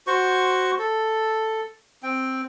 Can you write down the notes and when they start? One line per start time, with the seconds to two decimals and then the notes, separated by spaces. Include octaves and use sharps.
0.07 F#4 C5 C#6
0.79 A4
2.03 C4 G5